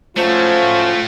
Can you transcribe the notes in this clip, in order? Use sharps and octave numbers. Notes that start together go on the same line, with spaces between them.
A2 F3 F#3 A3 C#4 F4 C5